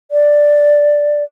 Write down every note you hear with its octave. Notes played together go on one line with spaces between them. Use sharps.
D5